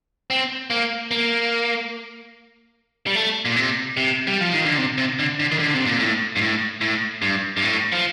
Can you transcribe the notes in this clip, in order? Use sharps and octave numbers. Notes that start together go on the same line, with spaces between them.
C4
A#3
A#3
G3
A3
A#2
C3
C3
G3
F3
D#3
D3
C3
C3
D3
D3
D#3
D3
C3
A#2
A2
G2
A2
A2
G2
G2
A2
F3